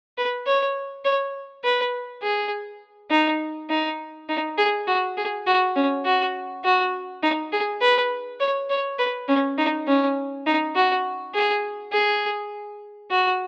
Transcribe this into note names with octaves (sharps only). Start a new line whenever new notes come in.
B4
C#5
C#5
B4
G#4
D#4
D#4
D#4
G#4
F#4
G#4
F#4
C#4
F#4
F#4
D#4
G#4
B4
C#5
C#5
B4
C#4
D#4
C#4
D#4
F#4
G#4
G#4
F#4